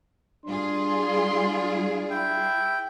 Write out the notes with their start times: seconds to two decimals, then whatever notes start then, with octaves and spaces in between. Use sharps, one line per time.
0.46 G3 D4 F4 G#4 C6
2.10 E4 G5